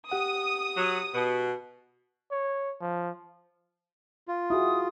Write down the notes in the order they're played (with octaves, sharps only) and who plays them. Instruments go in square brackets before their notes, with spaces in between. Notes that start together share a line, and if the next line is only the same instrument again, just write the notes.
[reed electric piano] G4 F#5 [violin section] D#6
[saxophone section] F#3
B2
[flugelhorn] C#5
F3
[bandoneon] F4
[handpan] E4 F#4 G#4 [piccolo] D#6